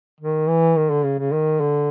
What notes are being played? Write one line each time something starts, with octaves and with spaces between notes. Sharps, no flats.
D#3
E3
D#3
D3
C#3
C#3
D#3
D3